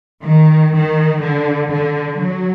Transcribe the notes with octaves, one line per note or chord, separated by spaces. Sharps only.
D#3
D#3
D3
D3
F#3